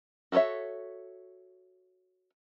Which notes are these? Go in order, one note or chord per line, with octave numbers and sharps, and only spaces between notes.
F#4 A4 B4 C#5 E5